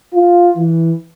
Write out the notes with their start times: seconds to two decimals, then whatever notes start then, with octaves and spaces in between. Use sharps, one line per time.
0.14 F4
0.57 E3